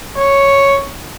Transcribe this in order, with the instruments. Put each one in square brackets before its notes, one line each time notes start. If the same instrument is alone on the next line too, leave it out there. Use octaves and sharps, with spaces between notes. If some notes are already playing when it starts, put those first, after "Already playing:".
[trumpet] C#5